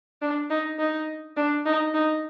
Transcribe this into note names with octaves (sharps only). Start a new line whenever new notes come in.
D4
D#4
D#4
D4
D#4
D#4